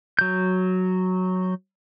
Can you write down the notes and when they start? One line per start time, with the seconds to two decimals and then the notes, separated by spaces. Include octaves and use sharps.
0.19 F#3 G6